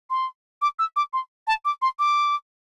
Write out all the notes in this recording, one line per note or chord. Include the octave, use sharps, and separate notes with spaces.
C6
D6
E6
D6
C6
A5
D6
C6
D6